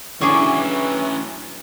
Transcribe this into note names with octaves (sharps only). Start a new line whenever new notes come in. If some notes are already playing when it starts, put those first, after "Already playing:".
D3 E3 F#3 C#4 E4 G#4 C#6 D6